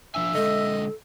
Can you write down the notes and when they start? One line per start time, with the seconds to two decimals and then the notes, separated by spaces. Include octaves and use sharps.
0.15 F3 D4 E5 G#5
0.35 D3 G#3 A4 D#5